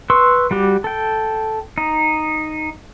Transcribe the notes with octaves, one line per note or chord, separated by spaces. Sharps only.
B4 C6 C#6 E6
G3 F#4 G4
A4 G5
D#4